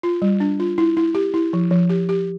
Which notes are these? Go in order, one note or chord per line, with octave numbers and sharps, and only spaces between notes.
F4
G3
D4
F4
E4
E4
G4
E4
F3
F3
G4
G4